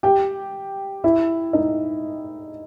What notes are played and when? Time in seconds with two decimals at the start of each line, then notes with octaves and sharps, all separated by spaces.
0.03 G4 G5
1.04 E4 E5
1.53 D#4 D#5